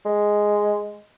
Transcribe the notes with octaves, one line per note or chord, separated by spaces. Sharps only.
G#3